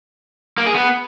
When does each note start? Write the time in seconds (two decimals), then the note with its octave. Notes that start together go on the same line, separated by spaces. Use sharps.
0.58 A#3
0.66 G#4
0.75 B3